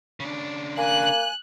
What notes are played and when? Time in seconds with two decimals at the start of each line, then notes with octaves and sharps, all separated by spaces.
0.20 C#3 D4
0.77 A#3 G#5 F#6